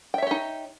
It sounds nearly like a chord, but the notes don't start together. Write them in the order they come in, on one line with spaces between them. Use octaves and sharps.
G5 E5 C#5 G4 D#4